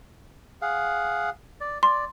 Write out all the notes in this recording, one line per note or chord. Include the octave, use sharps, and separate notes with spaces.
G#4 F5 F#5
D5
D5 C6